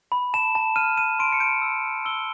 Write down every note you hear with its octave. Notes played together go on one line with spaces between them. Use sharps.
B5
A5 E7
A5
F6 D#7
F6 D#7
C6 D7
C#7
G6 D7
E6
E6
E6 G7